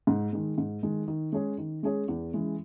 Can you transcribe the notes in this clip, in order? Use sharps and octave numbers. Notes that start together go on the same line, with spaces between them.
G#2
D#3 G#3
G#2
D#3 G#3
D#3
G#3 C#4 G#4 C#5
D#3
G#3 C#4 G#4 C#5
E2
C#3 E3 G#3